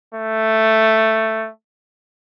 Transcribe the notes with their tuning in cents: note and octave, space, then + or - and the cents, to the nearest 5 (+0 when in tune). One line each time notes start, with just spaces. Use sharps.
A3 +5